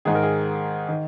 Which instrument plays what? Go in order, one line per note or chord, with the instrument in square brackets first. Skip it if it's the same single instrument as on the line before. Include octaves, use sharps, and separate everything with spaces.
[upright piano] G#2 D#3 G#4
A#4
G#4
D#3